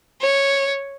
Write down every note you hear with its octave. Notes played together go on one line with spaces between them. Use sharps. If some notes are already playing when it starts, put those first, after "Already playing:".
C#5